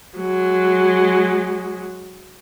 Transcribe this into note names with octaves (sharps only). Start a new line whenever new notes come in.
F#3 G#3